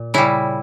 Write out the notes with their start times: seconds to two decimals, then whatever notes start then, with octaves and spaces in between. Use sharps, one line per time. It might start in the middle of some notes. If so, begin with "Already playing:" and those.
Already playing: A#2
0.14 C#3 G3 E4